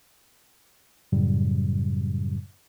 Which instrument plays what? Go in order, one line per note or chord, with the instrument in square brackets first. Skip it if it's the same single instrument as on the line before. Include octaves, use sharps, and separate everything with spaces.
[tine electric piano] F#2 A2 C#3 F#3 G3